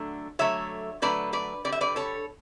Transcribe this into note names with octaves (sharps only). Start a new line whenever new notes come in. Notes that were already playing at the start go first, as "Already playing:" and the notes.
Already playing: D3 F#3 A3
D3 F#3 A3 C#5 E5
D3 F#3 A3 B4 D5
B4 D5
D3 G3 D5
E5
B4 D5
A4 C#5